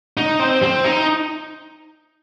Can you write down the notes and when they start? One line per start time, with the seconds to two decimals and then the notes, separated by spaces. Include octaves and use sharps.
0.17 D#4
0.40 C4
0.62 C4
0.84 D#4